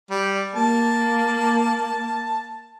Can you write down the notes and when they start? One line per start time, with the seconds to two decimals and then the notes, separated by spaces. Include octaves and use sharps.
0.10 G3
0.55 A#3 A5